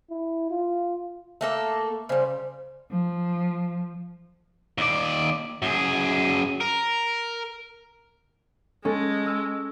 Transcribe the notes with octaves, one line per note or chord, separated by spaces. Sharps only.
E4
F4
A3 A#3 A4
C#3 G3 C5
F3
D#2 D5
F#2 G#4
A#4
G#3 C#4 A4
E6